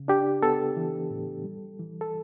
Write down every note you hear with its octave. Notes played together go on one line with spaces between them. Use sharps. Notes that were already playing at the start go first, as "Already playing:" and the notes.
Already playing: C#3
D4 G4
B3 A4
E3
A2
G3
E3
A4